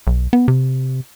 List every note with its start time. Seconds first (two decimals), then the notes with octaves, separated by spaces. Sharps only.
0.07 B1
0.33 B3
0.48 C3